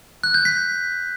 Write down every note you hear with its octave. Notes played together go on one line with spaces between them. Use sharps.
F#6
G6
B6